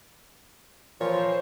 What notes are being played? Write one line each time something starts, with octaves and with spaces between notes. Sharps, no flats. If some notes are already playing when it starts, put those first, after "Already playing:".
A#2 E3 F3 F4 C5 C#5